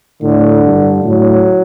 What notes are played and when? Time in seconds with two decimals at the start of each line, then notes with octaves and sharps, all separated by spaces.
0.22 A2 D3
0.64 G2
1.04 A2 F#3